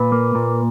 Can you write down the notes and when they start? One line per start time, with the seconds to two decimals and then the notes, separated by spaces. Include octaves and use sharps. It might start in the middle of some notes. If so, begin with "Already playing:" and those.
Already playing: A#2 B4
0.12 A#3
0.35 A#2